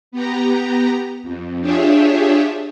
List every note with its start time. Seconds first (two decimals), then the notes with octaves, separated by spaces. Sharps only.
0.12 B3 G4 A#5
1.23 F2
1.61 D4 F4 G4 G#4 C#5 E5